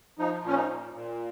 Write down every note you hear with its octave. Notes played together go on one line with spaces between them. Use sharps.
F3 D#4
A#2 C#4
D#4
A#2
A#2